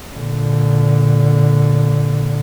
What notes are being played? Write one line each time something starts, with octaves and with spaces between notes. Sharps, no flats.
A#2 D3